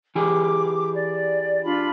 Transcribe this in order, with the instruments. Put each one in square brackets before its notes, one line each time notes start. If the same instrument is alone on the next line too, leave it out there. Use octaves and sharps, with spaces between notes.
[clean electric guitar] E3 G4 G#4 [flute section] D6
[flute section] D5
D4 F4 B5